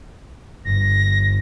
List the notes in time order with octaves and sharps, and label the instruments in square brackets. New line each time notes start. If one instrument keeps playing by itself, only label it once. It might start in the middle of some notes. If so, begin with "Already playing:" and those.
[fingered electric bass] G1 G2 [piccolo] A#6